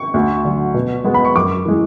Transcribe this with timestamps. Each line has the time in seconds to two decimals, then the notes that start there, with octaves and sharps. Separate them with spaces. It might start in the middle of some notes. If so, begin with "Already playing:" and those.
Already playing: C#6
0.14 D2
0.45 D3 F#3
0.74 B2
1.04 G#3 B3
1.14 B5
1.25 C#6
1.36 F#2 D6
1.65 E3 G#3